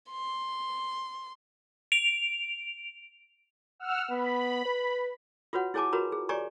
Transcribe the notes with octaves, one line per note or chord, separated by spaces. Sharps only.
C6
D7 F7
F#5 E6 F6
B3 B5
B4
F4 F#4 B4 C#5 F#5
E4 G#4 C#5 G#5 A5 D6
F4 F#4 A#4 B4 C#5 A#5
G#4
G4 C#5 D5 G#5 A#5 C#6